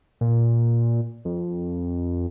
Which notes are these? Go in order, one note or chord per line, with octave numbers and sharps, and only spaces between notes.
A#2
F2